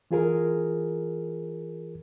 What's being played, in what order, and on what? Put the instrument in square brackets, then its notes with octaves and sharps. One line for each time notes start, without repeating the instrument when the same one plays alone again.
[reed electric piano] E3 F4 G#4 A#4